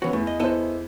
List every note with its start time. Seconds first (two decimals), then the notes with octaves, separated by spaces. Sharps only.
0.02 E3 B3 C#4 F#4
0.13 E2 A3
0.27 D#5
0.40 B3 E4 A4 C5 D#5